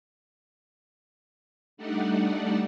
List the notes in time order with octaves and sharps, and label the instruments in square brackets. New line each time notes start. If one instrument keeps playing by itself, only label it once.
[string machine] G3 A3 D4 D#4 D5 F#5